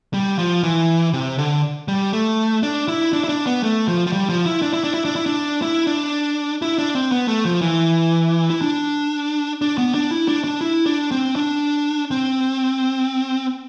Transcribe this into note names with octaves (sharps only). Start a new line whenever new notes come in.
G3
F3
E3
C3
D3
G3
A3
D4
E4
D4
E4
D4
B3
A3
F3
F3
G3
F3
E4
D4
E4
D4
E4
D4
E4
D4
E4
D4
E4
D4
C4
B3
A3
F3
E3
E4
D4
D4
B3
D4
E4
D4
D4
E4
D4
C4
D4
C4